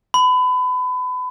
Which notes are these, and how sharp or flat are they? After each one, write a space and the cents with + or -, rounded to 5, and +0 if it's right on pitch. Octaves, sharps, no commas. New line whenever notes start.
B5 +30